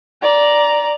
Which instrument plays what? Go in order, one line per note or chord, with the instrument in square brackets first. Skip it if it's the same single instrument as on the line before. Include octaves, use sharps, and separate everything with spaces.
[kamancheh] D5 A#5